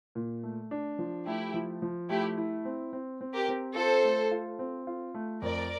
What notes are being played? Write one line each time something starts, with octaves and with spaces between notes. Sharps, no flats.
A#2
A3
D4
F3
A3 E4 G4
F3
F3
A3 E4 G4
E4
C4
C4
C4
G4 A#4
C4
F4 A4 C5
A3
F4
C4
F4
A3
F2 A#4 D5